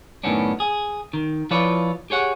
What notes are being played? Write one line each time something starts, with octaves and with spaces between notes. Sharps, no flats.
F#2 A2 D#3 B3 C#4 D4
G#4
D#3
F3 E4 F4 B4 C#5 D5
G4 G#4 C#5 F#5